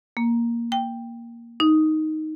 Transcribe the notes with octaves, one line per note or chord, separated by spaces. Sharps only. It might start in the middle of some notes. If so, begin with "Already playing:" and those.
A#3
G5
D#4